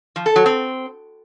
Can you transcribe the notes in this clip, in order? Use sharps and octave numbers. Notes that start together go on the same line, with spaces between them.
F3
A4
F#3
C4